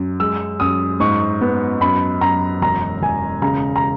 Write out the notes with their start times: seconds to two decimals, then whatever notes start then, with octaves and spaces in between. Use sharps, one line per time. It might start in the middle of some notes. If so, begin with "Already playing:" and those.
Already playing: F#2
0.20 G#3 E6
0.60 F#2 D#6
1.00 G#2 C#6
1.41 B3
1.81 F#2 B5
2.21 F#2 A#5
2.62 E1 A#5
3.01 E1 G#5
3.42 C#3 A#5
3.76 A#5